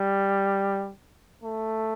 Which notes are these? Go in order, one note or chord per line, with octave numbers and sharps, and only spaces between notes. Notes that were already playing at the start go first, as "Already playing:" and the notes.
Already playing: G3
A3